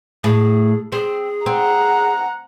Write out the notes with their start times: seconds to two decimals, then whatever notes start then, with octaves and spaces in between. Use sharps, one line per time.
0.24 A2 G#4
0.92 C4 G#4
1.46 C4 F#5 A#5